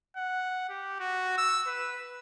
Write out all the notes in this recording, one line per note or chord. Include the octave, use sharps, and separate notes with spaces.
F#5
G4
F#4
E6
B4